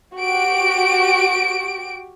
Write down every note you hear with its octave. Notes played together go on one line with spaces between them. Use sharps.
F#4 G4 D7